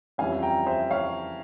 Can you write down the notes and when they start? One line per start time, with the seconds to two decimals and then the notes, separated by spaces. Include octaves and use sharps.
0.18 F2 E3 G3 C#4 E4 F5 G#5
0.42 G5 A#5
0.66 C5 E5
0.90 C#5 F5